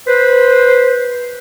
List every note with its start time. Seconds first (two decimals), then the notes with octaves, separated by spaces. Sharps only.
0.07 B4 C5